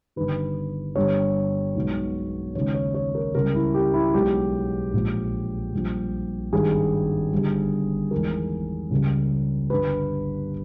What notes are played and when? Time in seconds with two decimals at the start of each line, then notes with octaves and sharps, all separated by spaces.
0.16 G1 G2 D#3 B4
0.96 G1 G2 G3 C#5
1.76 B1 B2 G#3
2.55 D#2 C#3 G#3 C#5
2.74 C#5
2.94 C#5
3.15 A#4
3.35 C#2 C#3 G3 A#4
3.55 E4
3.74 G4
3.94 E4
4.14 B1 B2 G#3 G4
4.93 A#1 A#2 G#3
5.72 A#1 A#2 G3
6.53 G#1 G2 G3 G#4
7.32 G1 G2 G3
8.11 E2 D#3 G#3 A#4
8.91 C#2 C#3 G3
9.70 G1 G2 G3 B4